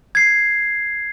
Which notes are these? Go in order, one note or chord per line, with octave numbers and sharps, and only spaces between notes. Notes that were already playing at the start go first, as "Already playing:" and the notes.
G#6 C7